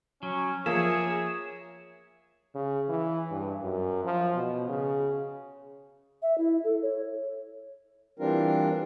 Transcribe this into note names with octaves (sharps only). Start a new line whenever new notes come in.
F#3 C#4
F3 A#3 G#4 C#5 E5
C#3
E3
G2
F#2
F3
B2
C#3
E5
E4
A4
C#5
E3 G3 C4 D4 F4 A#4